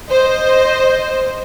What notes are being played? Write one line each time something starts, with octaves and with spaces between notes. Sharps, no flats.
C5 D#5